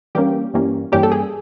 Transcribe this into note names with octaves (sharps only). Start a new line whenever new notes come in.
G2 E3 G3 A#3 C#4 G4
G2 E3 G3 A#3 C#4
G2 E3 G3 A#3 C#4 G4
A4
G#4